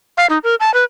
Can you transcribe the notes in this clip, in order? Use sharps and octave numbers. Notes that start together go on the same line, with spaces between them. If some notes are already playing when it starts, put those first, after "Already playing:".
F5
D#4
A#4
A5
B4